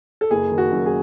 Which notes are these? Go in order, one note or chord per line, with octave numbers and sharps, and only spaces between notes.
A4
F#1 G#4
D#3
F#4
F#2
G#4